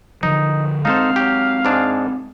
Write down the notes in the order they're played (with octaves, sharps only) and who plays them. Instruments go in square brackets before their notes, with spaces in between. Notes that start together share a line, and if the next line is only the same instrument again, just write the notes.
[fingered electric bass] D3 F3 [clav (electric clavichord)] D#4
[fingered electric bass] G#3 C4 [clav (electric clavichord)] D#4 A4 C5 [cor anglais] F5
[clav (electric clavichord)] F#3 G4
G#2 D4 G#4